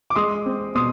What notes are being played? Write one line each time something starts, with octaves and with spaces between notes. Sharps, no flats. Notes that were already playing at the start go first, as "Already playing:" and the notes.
D6
G#3 C6 D#6
C4
B2 C6 D#6